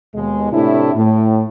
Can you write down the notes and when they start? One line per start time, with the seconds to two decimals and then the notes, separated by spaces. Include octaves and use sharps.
0.15 D#2 B2 G#3
0.52 A2 C3 A3 D4 E4
0.95 A2